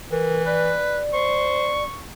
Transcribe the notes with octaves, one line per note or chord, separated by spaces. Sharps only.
E3 A#4
B4 D5
C5 C#6